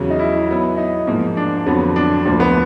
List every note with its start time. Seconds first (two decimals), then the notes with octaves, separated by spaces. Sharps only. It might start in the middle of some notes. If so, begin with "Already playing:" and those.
Already playing: E2 C#3 F#3
0.10 D#4
0.19 E4
0.48 F#3 B3 E4
0.77 D#4
1.07 G#2 F3 A#3
1.37 D4
1.66 F2 D3 F#3 B3
1.96 D4
2.25 D2 D3 F3 A#3
2.40 B3